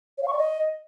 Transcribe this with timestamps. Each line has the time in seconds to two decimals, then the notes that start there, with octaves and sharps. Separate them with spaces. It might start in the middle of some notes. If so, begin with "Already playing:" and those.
0.18 C#5
0.23 F5
0.28 C#6
0.33 D5
0.38 D#5